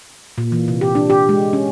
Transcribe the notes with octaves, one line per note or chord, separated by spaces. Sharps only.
A#2
E3
C3
G4
D4
G4
G#3
C#4